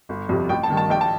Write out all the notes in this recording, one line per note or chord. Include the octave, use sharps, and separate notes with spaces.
G1
F2 C3 G3
A1 G5
A5
G2 D#3
A5
A#1 G5
A5